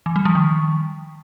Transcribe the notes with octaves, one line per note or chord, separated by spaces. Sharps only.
E3
G3
F3
D#3